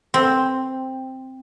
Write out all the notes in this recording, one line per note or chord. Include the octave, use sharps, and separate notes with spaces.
C4